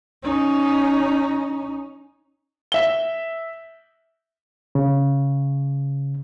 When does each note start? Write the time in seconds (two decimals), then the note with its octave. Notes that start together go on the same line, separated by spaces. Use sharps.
0.23 C#4 D#4
2.72 E5 G7
4.75 C#3